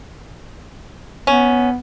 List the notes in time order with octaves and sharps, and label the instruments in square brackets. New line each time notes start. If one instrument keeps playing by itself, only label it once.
[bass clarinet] B3 [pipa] C#4